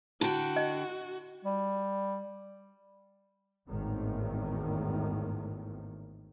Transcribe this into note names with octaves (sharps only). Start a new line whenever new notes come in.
D3 E4 F#4 G5
D#5
G3
G#1 E2 A2 D#3